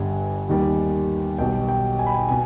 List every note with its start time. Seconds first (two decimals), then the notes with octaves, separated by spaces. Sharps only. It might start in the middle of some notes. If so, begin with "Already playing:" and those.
Already playing: G1 G2 D3 G3 G#5
0.48 D#2 D#3 G3
1.39 B1 B2 G3 G5
1.68 G5
1.99 G#5
2.06 B5
2.14 G#5
2.29 B2 G#5